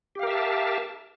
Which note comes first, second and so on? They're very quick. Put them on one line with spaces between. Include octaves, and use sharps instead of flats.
G4 F5 A#4 E5 A5